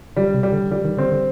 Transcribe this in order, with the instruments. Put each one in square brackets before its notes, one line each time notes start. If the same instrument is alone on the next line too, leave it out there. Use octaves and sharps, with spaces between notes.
[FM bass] D3 [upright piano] G3
[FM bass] C3
[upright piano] G3
[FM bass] D3
[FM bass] D3 [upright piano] G3
[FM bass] D#3
[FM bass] D3 [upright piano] C4
[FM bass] D3